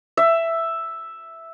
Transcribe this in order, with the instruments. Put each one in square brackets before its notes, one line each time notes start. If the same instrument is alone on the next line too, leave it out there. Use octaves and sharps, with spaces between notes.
[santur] E5